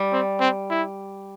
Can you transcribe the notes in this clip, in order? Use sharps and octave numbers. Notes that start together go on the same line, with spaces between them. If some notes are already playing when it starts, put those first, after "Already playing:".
Already playing: G3
C4
C4
E4